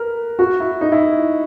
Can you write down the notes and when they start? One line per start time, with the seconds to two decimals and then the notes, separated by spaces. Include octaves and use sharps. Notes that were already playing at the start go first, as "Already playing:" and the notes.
Already playing: A#4 B4
0.39 F#4
0.60 E4
0.81 D#4
0.92 E4